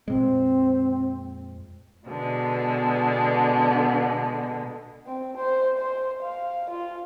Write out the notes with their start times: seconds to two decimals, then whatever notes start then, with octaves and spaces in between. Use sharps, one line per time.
0.08 F2 A#2 G#3 C4
2.07 B2 D3 G#3 B3
5.07 C4
5.37 C5
5.78 C5
6.23 F5
6.70 F4